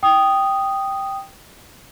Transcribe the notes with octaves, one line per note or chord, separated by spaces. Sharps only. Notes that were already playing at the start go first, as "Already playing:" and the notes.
G5 D#6